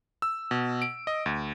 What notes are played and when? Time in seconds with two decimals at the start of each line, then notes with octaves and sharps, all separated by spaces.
0.22 E6
0.51 B2
0.82 D7
1.07 D#5
1.26 D2